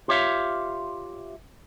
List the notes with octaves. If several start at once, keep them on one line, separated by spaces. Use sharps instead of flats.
F4 G4 C#5 E5 F5